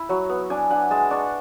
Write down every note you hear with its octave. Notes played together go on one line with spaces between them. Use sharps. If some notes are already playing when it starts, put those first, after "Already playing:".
Already playing: E4 B5
F#3 C#6
B3
D4 G#5
D4 F#5
G#3 A5
D4 C#6